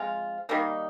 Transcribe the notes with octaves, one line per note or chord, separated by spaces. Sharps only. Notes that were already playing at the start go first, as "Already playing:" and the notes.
Already playing: F3 G#3 C4 F4
D#3 G3 A#3 D#4